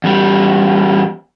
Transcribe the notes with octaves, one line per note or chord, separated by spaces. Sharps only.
E2 G3